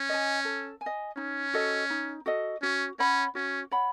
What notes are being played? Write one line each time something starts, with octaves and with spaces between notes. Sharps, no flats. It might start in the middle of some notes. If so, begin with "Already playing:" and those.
Already playing: C#4
D#5 G#5
A4
G#5
D#5
C#4 D#4
F#4 A4 D#5
D#4
F#4 A4 D#5
C#4 F#4
C#4 C#5 F#5 B5
C#4 F#4
C#5 F#5 B5